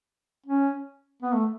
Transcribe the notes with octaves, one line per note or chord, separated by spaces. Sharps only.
C#4
B3
A3